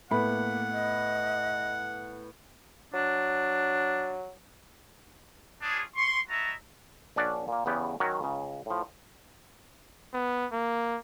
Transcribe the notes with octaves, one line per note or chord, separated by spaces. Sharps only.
A2 A#3 B3 F#5 B5
D#5
F#3 D4
C#4 D4 F4 G#4
C6 C#6
E4 F#4 D#5 E5 A5 A#5
A#1 C#4 D4 D5 F#5
A#2 A#3
E2 C#3 B3 G4
D#3 F#3 C#4 F#4 A#4
C#2 C#3
A2 F3
B3
A#3